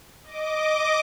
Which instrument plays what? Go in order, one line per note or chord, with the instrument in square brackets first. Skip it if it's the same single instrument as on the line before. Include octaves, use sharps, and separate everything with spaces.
[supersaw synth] D#5 D6